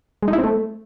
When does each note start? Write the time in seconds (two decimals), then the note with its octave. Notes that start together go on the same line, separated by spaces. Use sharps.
0.23 G#3
0.28 D#4
0.33 E4
0.38 C4
0.44 A3